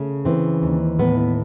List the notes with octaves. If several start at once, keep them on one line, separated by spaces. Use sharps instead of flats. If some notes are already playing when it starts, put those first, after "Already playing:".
Already playing: C#3 A3
E3 C4
D#2
A2 B3